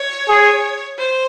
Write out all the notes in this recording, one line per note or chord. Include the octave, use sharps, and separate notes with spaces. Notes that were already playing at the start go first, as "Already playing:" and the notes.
Already playing: C#5
G#4
C5